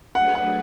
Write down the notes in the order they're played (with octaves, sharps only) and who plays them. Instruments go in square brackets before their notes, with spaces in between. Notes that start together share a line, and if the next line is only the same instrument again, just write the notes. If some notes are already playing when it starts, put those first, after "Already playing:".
[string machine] F#3 A3 D4 G#4 B4 [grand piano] F#5
[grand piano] F#5